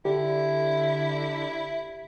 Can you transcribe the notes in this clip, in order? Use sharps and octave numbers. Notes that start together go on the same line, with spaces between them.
D3 E4 G4